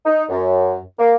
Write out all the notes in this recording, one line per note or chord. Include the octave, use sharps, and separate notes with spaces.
D#4
F#2
A#3